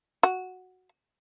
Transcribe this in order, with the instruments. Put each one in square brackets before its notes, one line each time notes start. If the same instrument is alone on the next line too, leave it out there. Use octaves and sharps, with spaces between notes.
[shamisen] F#4